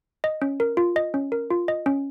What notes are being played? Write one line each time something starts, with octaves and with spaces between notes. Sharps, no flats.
D#5
C#4
A#4
F4
D#5
C#4
A#4
F4
D#5
C#4